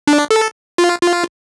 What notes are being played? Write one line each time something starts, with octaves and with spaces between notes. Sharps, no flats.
D4
A4
F4
F4